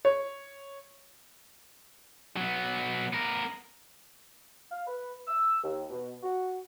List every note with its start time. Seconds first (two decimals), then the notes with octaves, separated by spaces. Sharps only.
0.05 C#5
2.36 F#3 B3
3.13 B3 A#4
4.70 F5
4.87 B4
5.27 E6
5.63 D#2
5.90 B2
6.23 F#4